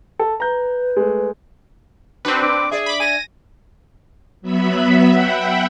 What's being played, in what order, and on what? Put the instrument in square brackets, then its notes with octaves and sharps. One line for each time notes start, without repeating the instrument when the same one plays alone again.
[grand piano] A4
[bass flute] B4 [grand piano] A#5 G6
[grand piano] G#3 A3
[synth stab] C4 B4 [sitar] D4 F#4
[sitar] D4 [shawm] D6
[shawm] G#4 [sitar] D5 E5
[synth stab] B5 D6
[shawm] G#5 [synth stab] A#6 D#7
[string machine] F#3 B3 E5 B5
E5 F#5 G5 B5